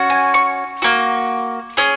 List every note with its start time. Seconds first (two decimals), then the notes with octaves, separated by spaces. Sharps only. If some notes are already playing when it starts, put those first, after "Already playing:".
Already playing: C#4 F#4
0.10 G#5
0.34 C#6
0.82 A#3 F#4
1.77 C#4 G#4